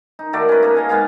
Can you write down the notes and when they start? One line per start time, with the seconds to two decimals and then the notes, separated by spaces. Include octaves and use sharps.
0.19 D#4
0.33 D#3 A3 F#4 D5
0.49 C#4 B4
0.63 A#3 A4
0.75 D#5 F5 G#5
0.89 G#2 B3 G#4 F5